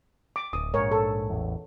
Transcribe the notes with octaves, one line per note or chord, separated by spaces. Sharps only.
D6
D1 D#6
A#1 G#2 A#4 C#5
A4
A1 E2